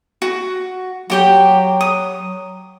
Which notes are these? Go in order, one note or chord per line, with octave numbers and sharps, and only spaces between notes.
F#4
F#3 F#4 G4 G5
D#6